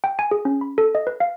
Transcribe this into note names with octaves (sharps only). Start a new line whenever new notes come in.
G5
G#5
G#4
C#4
B5
A4
D#5
B4
F5